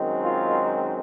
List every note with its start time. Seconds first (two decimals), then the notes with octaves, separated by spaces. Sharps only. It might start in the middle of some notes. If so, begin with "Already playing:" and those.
Already playing: F#2 D#3 G#3 C4
0.24 F4